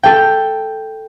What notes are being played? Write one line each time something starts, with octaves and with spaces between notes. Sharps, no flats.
A4 G5